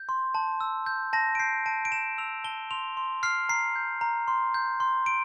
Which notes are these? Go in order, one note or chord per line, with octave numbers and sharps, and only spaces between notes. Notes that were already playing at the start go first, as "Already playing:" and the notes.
Already playing: G6
C6
A5
E6
G6
A5 A#6
D7
G6 C7
A5 D7
D7
A5 E7
E6 F7
A5 G7
C6 F7
C6
F6 C7
A#5 C7
G6
A#5
C6
G6
C6
C6 D7